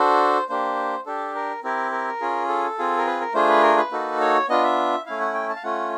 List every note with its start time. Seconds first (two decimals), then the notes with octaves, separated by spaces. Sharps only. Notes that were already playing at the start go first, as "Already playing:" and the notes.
Already playing: D4 F#4 A4 C5
0.49 A#3 D4 G4 C5
1.06 D4 G4 A4
1.35 A#4
1.64 C4 E4 G4 A#4
1.91 A#4
2.21 C#4 F4 G#4
2.49 A4
2.78 C4 F4 G#4
2.97 A#4
3.07 B4
3.21 A#4
3.34 A3 D4 F4 G#4 C5
3.48 B4
3.62 A#4
3.77 B4
3.91 A#3 D#4 F#4 A4
4.20 C#5
4.48 B3 D4 F4 D#5
4.63 E5
5.06 A3 C#4 E4 F5
5.20 F#5
5.34 G5
5.50 A5
5.56 F5
5.63 A3 C#4 F4 F#5